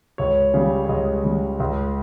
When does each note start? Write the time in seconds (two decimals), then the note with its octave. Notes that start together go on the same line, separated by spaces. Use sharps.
0.18 C#2 C#5
0.54 C#3 G3
0.84 C#5
0.89 C#2 D#5
1.24 C#3 G3
1.60 C#2